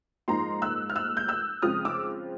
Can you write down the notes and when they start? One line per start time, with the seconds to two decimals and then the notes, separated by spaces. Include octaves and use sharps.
0.28 G#2 F3 A#3 D#4 A#5 C6
0.62 E6 F#6
0.90 F6
0.96 E6 F#6
1.17 G6
1.28 E6 F#6
1.62 C#3 F3 G#3 C4 F4 D#6 F6
1.85 D6 E6